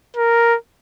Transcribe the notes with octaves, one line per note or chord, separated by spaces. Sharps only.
A#4